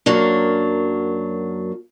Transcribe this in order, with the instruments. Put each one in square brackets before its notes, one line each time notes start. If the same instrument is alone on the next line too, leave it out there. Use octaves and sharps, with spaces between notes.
[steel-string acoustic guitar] F#2 F#3 A#3 D4